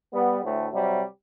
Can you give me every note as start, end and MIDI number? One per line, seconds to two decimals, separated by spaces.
0.12 0.38 55
0.12 0.38 59
0.43 0.68 38
0.43 0.68 45
0.43 0.68 57
0.72 1.02 48
0.72 1.02 54
0.72 1.02 55